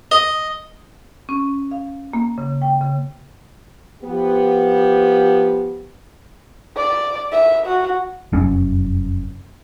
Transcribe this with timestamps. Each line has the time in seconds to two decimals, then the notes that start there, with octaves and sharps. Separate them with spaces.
0.11 D#5
1.29 C#4
1.71 F5
2.13 A#3
2.38 C#3
2.62 G5
2.81 C#3
4.03 F3 B3 G4
6.76 D5
7.32 E5
7.66 F#4
8.32 F1 F#2 C#4